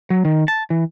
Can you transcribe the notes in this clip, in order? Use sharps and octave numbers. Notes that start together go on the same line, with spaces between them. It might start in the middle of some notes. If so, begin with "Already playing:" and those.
F#3
D#3
A5
E3